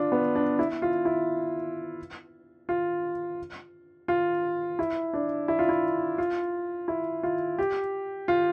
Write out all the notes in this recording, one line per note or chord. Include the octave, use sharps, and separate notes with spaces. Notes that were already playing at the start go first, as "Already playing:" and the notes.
Already playing: D4 F4
B3
D4
E4
F4
E4
F4
F4
E4
D4
E4
F4
E4
F4
E4
F4
G4
F4